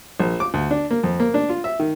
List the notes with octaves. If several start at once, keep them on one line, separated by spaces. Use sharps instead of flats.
A#1
D6
D2
D4
A#3
F2
A#3
D4
F4
E5
D#3